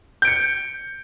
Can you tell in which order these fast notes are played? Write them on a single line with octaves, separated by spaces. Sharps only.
G6 D7 C#7